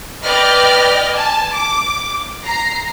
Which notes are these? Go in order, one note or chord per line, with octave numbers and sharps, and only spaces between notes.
B4 D5 D#5 G5 F6
G#5 A5
D6
A#5 C7